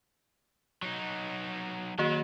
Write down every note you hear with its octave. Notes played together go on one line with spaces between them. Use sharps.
F#3 D#4
D#3 F#3 A#3 F#4